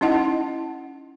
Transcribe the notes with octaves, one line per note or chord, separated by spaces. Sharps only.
C#4 D#4 E4 D#5 F#5 A5